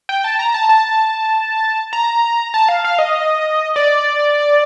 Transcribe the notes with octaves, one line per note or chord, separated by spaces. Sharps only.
G5
A5
A#5
A5
A5
A#5
A5
F5
F5
D#5
D5